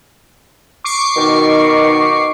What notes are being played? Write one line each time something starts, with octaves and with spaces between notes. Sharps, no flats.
C#6 D6 C7
B2 D#3